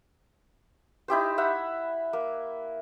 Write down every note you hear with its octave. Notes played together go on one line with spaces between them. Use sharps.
D#4 E4 G4 C5
E5 F#5 B5
A#3